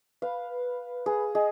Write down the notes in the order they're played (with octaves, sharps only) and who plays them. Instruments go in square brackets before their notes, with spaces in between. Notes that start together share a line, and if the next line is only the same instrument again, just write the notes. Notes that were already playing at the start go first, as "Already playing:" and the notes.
[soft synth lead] B4 [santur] F5
[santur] G#4 [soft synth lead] B4
[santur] G#4 [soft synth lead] D#5